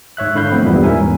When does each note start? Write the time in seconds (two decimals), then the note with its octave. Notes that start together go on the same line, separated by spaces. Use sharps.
0.17 G#2 C#5 E5 F#6
0.35 D3 E4 F5 B5 F#6 G6
0.51 F3 A3 B3 C4
0.64 E2 G2 A#2 G3 B3 E4
0.84 G#2 C#4 A#4 E5 G#5
1.00 E2